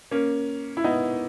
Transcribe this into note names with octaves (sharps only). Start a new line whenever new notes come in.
A#3 C#4
E4
B3 D#4